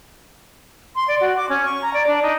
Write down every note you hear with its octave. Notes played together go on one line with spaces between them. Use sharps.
C6
D5
F#4
D6
C#4
C#6
A#5
D5
D4
D#4